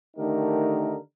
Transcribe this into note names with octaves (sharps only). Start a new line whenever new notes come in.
D3 D#3 A3 D#4 G4 A#4